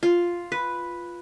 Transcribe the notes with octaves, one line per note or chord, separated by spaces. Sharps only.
F4
B4